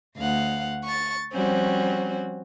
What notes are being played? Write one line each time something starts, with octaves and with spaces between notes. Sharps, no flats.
D2 F5 F#5
C#6 A6
F3 G3 C4 C#4 F#4